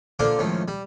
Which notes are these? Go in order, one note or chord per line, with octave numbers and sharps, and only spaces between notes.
D3 A#3 D4 F4 C5 D6
C#2 A2 D#3 F3
G3